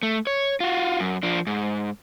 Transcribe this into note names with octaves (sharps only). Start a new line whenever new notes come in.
A3
C#5
F4 F#4
F#2
F3 D4
G#2